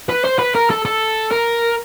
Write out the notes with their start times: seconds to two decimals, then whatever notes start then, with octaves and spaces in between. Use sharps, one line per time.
0.09 B4
0.24 C5
0.39 B4
0.55 A#4
0.70 A4
0.85 A4
1.32 A#4